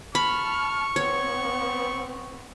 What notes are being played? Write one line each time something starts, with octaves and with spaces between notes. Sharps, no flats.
A5 B5 C#6 F6
B3 C4 C#5